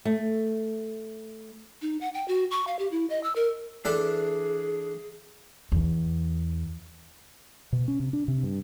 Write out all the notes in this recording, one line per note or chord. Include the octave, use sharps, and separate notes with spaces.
A3
D#4
F#5
G5
F#4
C#6
F5
G4
E4
D#5
E6
A#4
E3 D4 G#4 A4
E2
B2
C#4
C3
D4
C3
G2